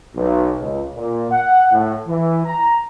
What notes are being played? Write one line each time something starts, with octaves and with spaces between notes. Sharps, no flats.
B1
C#2
A#2
F#5
A2
E3
A#5